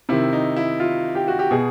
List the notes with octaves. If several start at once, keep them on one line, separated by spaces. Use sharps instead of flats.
C3 D#3 E4
D#4
E4
F4
G4
F#4
G4
B2 G#4